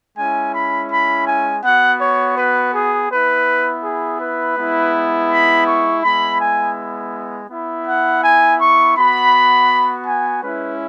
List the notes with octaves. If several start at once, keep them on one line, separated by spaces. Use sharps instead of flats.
G#3 C#4 E4 G#5
B5
B5
G#5
B3 F#4 F#5
C#5
B4
G#4
B3 E4 B4
G#4
B4
G#3 B3 E4
B5
C#6
G#3 B3 E4 B5
G#5
B3 E4
F#5
G#5
C#6
B3 F#4 B5
G#5
G#3 C#4 E4 B4